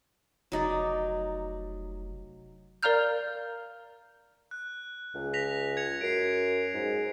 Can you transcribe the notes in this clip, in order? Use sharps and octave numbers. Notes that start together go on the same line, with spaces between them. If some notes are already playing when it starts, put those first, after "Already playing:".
F1 F#3 D#4 D5
A#4 D5 F5 A#5 F6 G6
F#6
C#2
A#6 B6 F7
G#6 C#7 F7
F#2 C7 D7
G#2